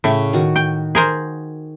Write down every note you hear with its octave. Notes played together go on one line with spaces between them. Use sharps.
A2 C#3 E5 C#6
D#3 F#4
G5
G#4 A#4 C5